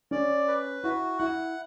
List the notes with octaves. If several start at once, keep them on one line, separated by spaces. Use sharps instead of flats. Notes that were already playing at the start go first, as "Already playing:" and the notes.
C#4 D5
B4
E4 F#4
E4 F#5